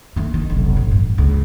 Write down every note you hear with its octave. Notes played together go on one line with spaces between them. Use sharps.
D#3 A3
D#3
F1 B1
A1
G2
C#2